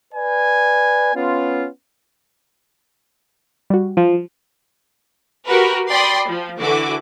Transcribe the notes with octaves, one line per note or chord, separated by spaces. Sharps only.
B4 D5 G#5
B3 C#4 F4
G3 F#4
F3
F#4 G4 A#4 B4
D5 G5 B5 C6 D#6
F3
D3 E3 F#4 D6